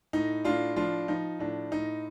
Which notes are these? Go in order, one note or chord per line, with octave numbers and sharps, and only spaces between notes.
A2 D#4
A2 D4 F4
F3 D4 F4
F3 D#4
A2 D4
A2 D#4